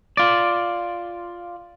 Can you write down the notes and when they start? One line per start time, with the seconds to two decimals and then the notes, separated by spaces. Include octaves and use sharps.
0.17 F4 D5